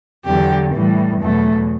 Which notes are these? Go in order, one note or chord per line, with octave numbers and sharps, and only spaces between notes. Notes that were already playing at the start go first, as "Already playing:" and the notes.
E2 D3 F#3 G4
A2 E3 G3
E2 B2 F#3 A3